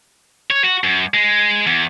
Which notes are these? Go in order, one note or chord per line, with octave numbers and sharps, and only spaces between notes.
C#5
F#4
F#2
G#3
E2